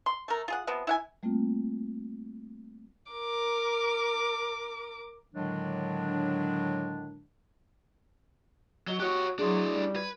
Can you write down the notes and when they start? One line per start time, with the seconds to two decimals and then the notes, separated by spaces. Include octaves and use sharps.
0.06 C6
0.28 A3 A#4
0.48 F4 G#4 F#5
0.67 C3 F3 B3
0.87 E4 F#5 G#5
1.23 G3 A3 A#3 C4 F4
3.12 A#4 D6
5.34 A2 D3 D#3 F#3 G#3 D4
8.88 F#3 F#4 D#5 G7
9.00 F#4 G4 C#5 F#6
9.39 F#3 D4 E4 G#4 C6 D#6
9.72 G3
9.96 B4 G#6